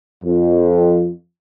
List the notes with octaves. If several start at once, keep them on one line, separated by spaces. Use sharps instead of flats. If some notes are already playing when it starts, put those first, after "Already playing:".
F2